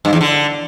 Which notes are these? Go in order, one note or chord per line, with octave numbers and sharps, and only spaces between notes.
G2
E2
D3